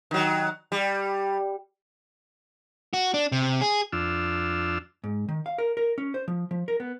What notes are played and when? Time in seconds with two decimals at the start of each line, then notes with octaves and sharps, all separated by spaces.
0.11 D#3 F#3
0.72 G3
2.93 F#4
3.14 D4
3.32 C3
3.61 G#4
3.93 F2 D4 F4 E6
5.04 G#2
5.29 D#3
5.46 F5
5.58 A#4
5.77 A#4
5.98 C#4
6.14 C5
6.28 F3
6.51 F3
6.68 A#4
6.80 B3